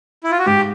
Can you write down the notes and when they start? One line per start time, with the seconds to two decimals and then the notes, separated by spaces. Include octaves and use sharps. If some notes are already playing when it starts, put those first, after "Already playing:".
0.24 E4
0.31 F4
0.39 F#4
0.46 G#2 G4